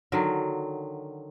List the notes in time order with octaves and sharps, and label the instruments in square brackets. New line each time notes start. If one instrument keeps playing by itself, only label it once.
[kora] D3 D#3 F#3